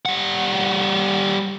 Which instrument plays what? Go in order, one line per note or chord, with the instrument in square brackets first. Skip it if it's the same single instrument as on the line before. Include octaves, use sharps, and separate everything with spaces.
[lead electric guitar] G3 F#5